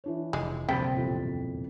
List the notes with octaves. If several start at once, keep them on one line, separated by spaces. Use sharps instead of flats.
E3 D4 C#5
F1 G#3
D1 A#1 G2 C3 G5 B5 A6 B6
E1 F2 E4